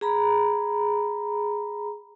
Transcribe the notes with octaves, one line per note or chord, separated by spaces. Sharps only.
G#4 A#5 B5